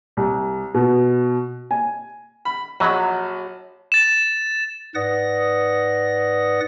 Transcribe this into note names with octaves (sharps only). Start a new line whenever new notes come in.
C2
B2
G#5
B5
A#1 F#3 D#5 B5
A6 E7
G#2 B4 D5 F#5 D#6 A#6